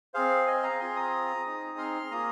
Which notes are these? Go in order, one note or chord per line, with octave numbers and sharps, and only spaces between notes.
C4 G#4 C5 F5
D#5 G#5
F5 A#5
C4 F4 G#4 G#5 C6
A#5 D#6
C4 D#4 G#4
C6 F6
A#3 F4 G#4 A#5 D#6